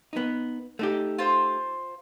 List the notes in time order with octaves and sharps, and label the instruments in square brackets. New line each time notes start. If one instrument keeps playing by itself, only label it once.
[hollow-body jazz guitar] B3 D#4
A3 D#4 G4
[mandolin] F4 C5